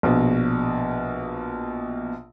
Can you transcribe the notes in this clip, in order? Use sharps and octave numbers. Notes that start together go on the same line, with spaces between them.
A#1 B2